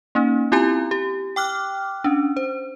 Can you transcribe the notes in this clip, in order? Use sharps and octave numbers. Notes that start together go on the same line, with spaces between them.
A#3 C#4 D#4
C4 E4 F4 G4 G#5 A#5
G4
G5 D6 F6 F#6
C#4 D4
C5